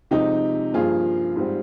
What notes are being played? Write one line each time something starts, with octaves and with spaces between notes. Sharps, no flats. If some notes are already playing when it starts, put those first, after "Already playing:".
C3 F3 G#3 D#4 G4
G2 F3 A#3 F4 G#4
G#2 G3 C4